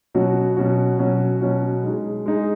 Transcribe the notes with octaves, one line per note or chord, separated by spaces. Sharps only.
B2 F#3 C#4 F#4
B2 F#3 C#4 F#4
B2 F#3 C#4 F#4
B2 F#3 C#4 F#4
G#3 D#4 G#4
G#3 D#4 G#4